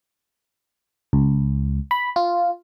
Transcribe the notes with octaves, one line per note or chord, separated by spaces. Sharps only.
C#2
B5
F4